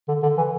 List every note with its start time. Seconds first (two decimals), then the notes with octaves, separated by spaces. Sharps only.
0.08 D3
0.23 D3
0.37 E3